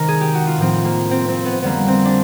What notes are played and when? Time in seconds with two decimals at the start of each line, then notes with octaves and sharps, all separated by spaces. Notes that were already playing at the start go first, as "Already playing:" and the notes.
Already playing: C3 D#3 G#3 A#4
0.08 G#4
0.21 G4
0.34 F#4
0.47 F4
0.58 A2 F3 A#3 C4
0.85 A#3
1.11 C4
1.28 C4
1.45 B3
1.62 F2 D3 G3 A#3 B3
1.88 C4
2.05 D4